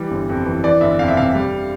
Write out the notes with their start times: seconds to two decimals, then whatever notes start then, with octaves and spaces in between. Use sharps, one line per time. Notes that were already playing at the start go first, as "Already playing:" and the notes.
Already playing: E3 G3
0.11 G1
0.29 F2
0.46 E3
0.64 E3 D5
0.81 G1 E5
0.99 F2 F5
1.08 E5
1.16 C3 F5
1.34 G3